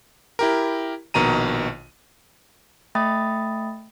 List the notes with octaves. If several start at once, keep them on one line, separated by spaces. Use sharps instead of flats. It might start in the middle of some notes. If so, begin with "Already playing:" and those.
E4 G4 A#4
A#1 B2 D#3 A#5 D#7
A3 E5 G5 B5 D#6 A6